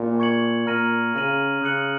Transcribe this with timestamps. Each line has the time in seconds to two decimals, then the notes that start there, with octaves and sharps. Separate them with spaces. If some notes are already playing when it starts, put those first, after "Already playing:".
Already playing: A#2
0.20 C#6 G#6 C#7 F#7
0.67 A#2 A#5 F6 A#6 D#7 F#7
1.14 C#3 A#5 F6 A#6 D#7 F#7
1.61 C#3 D#6 F#6 C#7 F#7